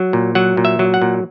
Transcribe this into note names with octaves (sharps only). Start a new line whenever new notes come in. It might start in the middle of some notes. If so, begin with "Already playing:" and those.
Already playing: F#3
A#2
F#3 F#5
A#2
E5
F#3
F#5
A#2